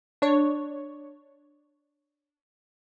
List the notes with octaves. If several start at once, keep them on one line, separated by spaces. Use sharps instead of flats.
D4 C#5